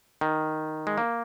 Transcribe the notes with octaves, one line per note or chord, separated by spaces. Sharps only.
D#3
G#3
A#3